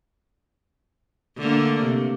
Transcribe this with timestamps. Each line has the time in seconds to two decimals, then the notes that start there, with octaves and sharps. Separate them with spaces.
1.37 D3 A3 A#3
1.83 C3